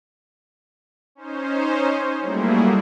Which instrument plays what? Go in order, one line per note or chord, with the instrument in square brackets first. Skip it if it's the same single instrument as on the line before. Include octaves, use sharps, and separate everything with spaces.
[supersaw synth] C#4 D#4 C5
F#3 G3 A3 A#3 E4 G#4